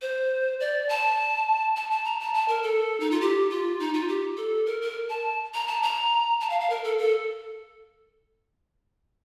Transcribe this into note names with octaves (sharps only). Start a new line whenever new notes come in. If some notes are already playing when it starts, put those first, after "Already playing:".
C5
D5
A5
A5
A5
A#5
A5
A5
A#4
A4
D#4
F4
G4
F4
D#4
F4
G4
A4
A#4
A#4
A5
A#5
A5
A#5
A5
F5
F5
A#4
A4
A4